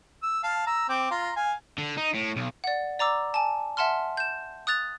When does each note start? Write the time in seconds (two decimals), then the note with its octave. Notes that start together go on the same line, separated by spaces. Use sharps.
0.23 E6
0.43 F5 A5
0.67 A#5 E6
0.89 C4 G5 D6
1.11 F4 A#5 C6
1.36 F5 G#5
1.78 D3
1.97 D#4
2.15 A2
2.36 B1
2.64 D5 F#5
2.99 D5 A#5 D6 E6
3.34 G#5 A5
3.77 E5 F#5 A5 C6 F6
4.17 G6 E7
4.67 D#6 F#6 A6 F7